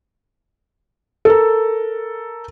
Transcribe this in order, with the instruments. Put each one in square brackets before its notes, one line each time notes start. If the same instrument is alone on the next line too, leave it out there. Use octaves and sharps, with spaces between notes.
[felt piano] A4 A#4